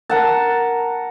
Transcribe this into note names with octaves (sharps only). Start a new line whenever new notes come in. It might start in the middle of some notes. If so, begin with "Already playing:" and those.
A#4 F#5 A5